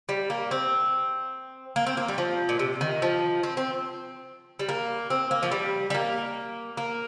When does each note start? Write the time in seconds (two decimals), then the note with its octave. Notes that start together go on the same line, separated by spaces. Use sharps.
0.09 G3
0.30 A#3
0.51 C4
1.76 A#3
1.87 C4
1.97 A#3
2.08 G3
2.18 F3
2.49 A#2
2.59 C3
2.81 D#3
3.02 F3
3.43 C4
3.57 C4
4.59 G3
4.69 A#3
5.10 C4
5.31 A#3
5.43 F3
5.52 G3
5.90 G3
5.94 A#3
6.77 A#3